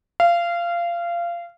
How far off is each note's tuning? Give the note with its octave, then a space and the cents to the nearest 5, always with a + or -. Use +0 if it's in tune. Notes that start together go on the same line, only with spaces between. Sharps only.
F5 -20